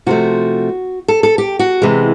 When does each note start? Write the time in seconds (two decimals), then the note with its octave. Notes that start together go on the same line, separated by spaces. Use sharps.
0.06 C3 F3 A3 F#4
1.08 A4
1.23 A4
1.38 G4
1.59 F#4
1.82 C3 E3 G#3